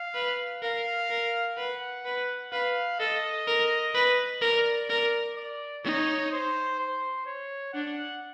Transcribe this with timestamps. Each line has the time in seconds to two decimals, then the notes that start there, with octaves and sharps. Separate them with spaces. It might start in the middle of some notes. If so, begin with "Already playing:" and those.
Already playing: F5
0.14 B4
0.62 A#4 F5
1.10 A#4
1.57 B4 F#5
2.05 B4
2.52 B4 F5
3.00 A4 D#5
3.47 A#4
3.94 B4
4.41 A#4 D5
4.89 A#4
5.36 D5
5.84 D#4 C#5
6.32 C5
6.79 C5
7.26 C#5
7.73 D4 F#5